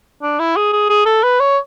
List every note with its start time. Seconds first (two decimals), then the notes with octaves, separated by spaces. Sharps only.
0.23 D4
0.39 E4
0.57 G#4
0.73 G#4
0.90 G#4
1.06 A4
1.23 B4
1.40 C#5